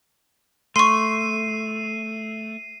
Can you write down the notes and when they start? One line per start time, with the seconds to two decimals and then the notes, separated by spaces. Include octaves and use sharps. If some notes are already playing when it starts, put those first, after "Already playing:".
0.76 A3 C6 C#6 C7 D#7